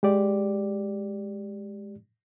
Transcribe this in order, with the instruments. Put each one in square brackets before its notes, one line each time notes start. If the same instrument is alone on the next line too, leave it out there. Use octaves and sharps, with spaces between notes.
[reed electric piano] G#3 G4 D5